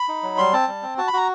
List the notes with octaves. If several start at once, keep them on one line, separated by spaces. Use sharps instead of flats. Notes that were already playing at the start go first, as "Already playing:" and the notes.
Already playing: B5
D#4
F#3
G3 C6
C4 A5
G3
C4
F#4 A5
B5
F#4 A#5